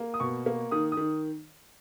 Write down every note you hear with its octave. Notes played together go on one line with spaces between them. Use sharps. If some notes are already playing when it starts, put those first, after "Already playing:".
Already playing: A#3
D#6
B2 C#6
A#3
D#3 D#6
D#6
D#3